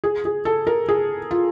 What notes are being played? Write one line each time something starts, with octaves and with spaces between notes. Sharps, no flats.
G#4
G#4
A4
A#4
G#4
F4